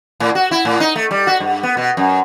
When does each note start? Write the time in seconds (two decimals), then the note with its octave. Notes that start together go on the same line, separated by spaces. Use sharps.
0.20 A2
0.35 F#4
0.51 E4
0.65 A2
0.80 D#4
0.96 A3
1.11 G3
1.27 F#4
1.40 G2
1.63 B3
1.77 B2
1.97 F#2